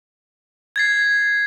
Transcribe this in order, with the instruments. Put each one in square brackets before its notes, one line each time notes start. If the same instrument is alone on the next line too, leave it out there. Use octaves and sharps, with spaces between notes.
[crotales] G#6 A6 C7